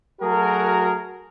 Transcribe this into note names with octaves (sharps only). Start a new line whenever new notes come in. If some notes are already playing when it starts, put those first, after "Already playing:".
F#3 A3 F#4 G#4 A#4